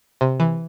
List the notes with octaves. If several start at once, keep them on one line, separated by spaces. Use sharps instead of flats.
C3
E3